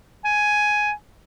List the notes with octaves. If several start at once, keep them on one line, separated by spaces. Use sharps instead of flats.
G#5